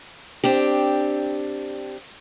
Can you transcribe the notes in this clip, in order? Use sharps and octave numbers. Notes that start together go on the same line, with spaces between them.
C4 D4 G4